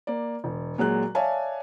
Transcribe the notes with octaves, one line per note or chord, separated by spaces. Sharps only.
A#3 D5
E1
A#2 F#3 G#3 F#6
C#5 D5 E5 F5 G#5 A5